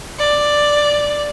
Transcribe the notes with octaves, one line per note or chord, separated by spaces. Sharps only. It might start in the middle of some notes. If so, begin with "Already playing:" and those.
D5